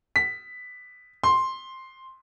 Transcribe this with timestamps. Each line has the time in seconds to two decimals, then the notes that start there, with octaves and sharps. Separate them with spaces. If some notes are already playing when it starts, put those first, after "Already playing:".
0.16 B6
1.24 C6